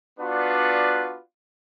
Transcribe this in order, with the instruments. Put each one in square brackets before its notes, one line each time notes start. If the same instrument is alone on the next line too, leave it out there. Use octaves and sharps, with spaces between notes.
[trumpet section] B3 D4 F4 F#4 B4 D5